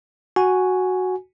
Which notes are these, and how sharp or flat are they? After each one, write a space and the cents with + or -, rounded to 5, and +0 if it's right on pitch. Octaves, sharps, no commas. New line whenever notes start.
F#4 +0 G#5 +0